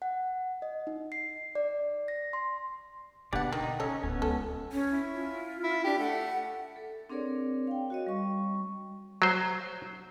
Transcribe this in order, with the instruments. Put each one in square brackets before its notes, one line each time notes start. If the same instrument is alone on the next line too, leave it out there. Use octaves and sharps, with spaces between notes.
[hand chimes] F#5
D#5
D#4
C7
D5
A#6
C6
[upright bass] B2 D3 [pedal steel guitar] B3 D4 D5 [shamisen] G4 F#5
[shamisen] D#3 [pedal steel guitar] D#4
[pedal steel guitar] C#4 [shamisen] A4 C#5 D#5
[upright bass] D1 [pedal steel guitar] B3 C#4
[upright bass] C#2 [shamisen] A4
[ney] C#4
[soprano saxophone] E4
[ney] F4
[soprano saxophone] E4
[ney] D4 [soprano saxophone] G4
[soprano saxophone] A3 [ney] F#5
[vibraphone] A4
C4 D4 G#4 A#4 C#5 D5
F5 G5
F#4 C#5 D#5
G3 C#6
[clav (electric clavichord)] F#3 C5